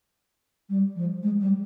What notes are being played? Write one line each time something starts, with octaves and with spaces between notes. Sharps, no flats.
G3
F3
G#3
G3